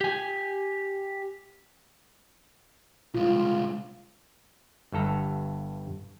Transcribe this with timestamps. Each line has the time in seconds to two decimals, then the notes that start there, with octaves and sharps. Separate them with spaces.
0.01 G4 G#5
3.14 C2 G#3 F4
4.92 G1 G2 A4 A#5